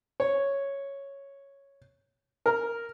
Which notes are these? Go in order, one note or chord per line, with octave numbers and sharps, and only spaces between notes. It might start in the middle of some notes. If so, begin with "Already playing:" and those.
C#5
A#4